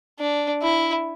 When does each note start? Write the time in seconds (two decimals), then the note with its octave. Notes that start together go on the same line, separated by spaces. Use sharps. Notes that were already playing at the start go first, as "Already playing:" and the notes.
0.20 D4
0.62 E4